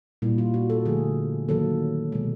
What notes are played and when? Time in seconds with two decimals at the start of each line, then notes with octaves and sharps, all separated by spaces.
0.22 A#2 G3 A#3 E4
0.38 F4
0.54 F#4
0.70 A4
0.86 D3 F3 A3 G#4
1.48 D#3 F#3 A#3 A4
2.12 B2 G#3